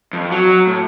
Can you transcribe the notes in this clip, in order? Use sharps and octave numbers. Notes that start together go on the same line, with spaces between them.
F2
F#3
A2